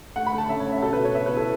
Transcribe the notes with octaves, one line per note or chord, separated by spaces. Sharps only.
A3 F#5
B5
A3
A5
C#4 E5
C#5
C#4
E5
B2 A4
B4
B2
C#5
B3 E5
B4
E4
A4